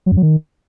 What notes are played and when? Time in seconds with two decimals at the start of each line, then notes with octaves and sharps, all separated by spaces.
0.06 F#3
0.12 F#2
0.17 F#3
0.22 D#3